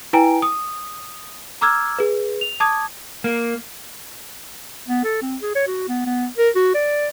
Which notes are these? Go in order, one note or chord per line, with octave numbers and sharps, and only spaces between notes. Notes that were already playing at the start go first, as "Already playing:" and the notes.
E4 B4 G5 G#5 A#5 D7
D#6
A#5 D6 E6 F6 G#6
G#4 B4
F7
A5 D6 D#6 G#6
A#3
B3
A4
C4
G#4
C#5
F#4
B3
B3
A#4
F#4
D5